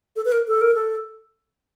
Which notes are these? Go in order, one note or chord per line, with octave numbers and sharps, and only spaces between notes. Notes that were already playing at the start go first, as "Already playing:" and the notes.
A4
B4
A#4
A4
A#4
A4